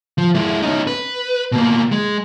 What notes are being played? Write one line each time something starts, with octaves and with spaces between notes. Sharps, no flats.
F3
G#3 E4
C#4 D#4
B4
B2 A#3
G#3